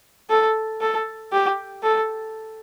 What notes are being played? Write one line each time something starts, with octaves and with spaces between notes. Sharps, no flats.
A4
A4
G4
A4